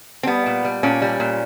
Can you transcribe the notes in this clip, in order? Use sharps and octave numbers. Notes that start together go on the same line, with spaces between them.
C4
G3 B3
A#2
G3
A#2 C#4
G3
A#2